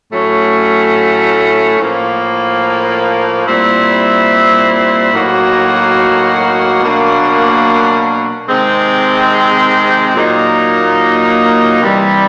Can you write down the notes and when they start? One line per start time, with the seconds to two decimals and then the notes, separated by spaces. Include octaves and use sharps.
0.12 A2 F#3 A3 C#4
1.78 A2 F3 A#3
3.46 A#2 G3 C4 E4
5.13 A2 F#3 A#3 D#4 F#4
6.80 B2 F#3 A#3 D4
8.47 C3 D#3 G#3 C4
10.15 A#2 F#3 A#3 D#4
11.81 C3 E3 G3